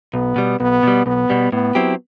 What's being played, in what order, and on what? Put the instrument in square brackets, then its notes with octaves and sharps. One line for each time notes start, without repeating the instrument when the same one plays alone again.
[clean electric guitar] B1 [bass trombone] B3
[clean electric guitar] B2 G3
[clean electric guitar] B1 [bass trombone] B3
[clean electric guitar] B2 G3
[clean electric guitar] B1 [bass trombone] B3
[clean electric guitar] B2 G3
[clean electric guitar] A2 [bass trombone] B3
[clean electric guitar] F#3 C4 E4 G4